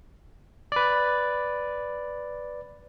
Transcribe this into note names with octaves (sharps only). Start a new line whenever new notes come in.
B4 D5